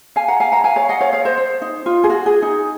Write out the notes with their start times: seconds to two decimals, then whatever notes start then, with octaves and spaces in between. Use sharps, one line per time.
0.16 F5 G#5
0.28 F#5 A#5
0.40 F5 G#5
0.52 F#5 A#5
0.64 F5 G#5
0.76 C#5 F5
0.89 D#5 F#5
1.01 C#5 F5
1.13 C#5 F5
1.25 C5 D#5
1.38 C5
1.62 D#4
1.86 F4
2.04 G#4
2.10 F#4
2.26 G#4
2.42 D#4